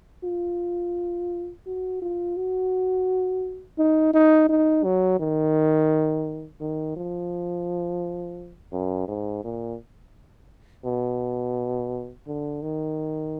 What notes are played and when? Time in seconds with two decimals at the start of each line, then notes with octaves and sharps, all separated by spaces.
0.24 F4
1.66 F#4
2.02 F4
2.37 F#4
3.78 D#4
4.14 D#4
4.49 D#4
4.84 F#3
5.20 D#3
6.61 D#3
6.96 F3
8.73 F#2
9.08 G#2
9.44 A#2
10.85 B2
12.27 D3
12.62 D#3